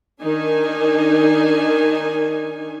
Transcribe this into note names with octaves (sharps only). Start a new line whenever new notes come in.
D#3 D4 D#4 G#5